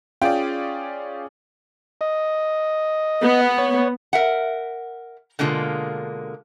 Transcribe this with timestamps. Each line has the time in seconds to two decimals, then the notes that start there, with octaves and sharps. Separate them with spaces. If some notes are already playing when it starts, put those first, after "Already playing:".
0.22 C#4 F4 G#4 D5 G5
2.01 D#5
3.23 B3
3.58 C#5
4.13 A#4 E5 F#5
5.39 B2 D3 G#3 A#3 F4